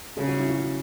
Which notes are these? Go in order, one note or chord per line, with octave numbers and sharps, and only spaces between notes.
C#3 G#4
F#4
E4
F#4